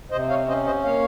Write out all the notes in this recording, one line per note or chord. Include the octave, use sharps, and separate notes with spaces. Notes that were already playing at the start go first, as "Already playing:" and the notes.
C3 C5 D#5
C#5 F5
C#4 C5 D#5
C5 D#5
A#3 C#5 F5